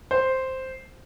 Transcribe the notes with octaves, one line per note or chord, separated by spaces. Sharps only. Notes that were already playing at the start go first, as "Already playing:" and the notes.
C5